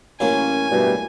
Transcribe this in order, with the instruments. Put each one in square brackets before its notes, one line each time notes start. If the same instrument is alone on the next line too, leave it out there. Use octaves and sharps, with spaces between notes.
[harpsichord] A1 F#3 A#3 [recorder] C#4 [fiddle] G#5
[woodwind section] G2 B2 A3 [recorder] G3